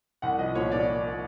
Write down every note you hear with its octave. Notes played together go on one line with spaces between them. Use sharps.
C2 F#5
F3 D#5
A#2 C#5
A#2 D5